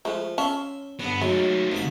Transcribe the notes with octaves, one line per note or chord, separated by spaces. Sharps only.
F3 G#3 A3 E4
C#4 E5 F5 A5 C6
G2 D3 B3
D#3 F#3 G#3 A3
C2 G#2 B5